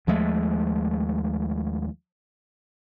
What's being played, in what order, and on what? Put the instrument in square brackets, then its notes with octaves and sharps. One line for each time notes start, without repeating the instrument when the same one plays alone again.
[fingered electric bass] D#2 F3 G#3 A3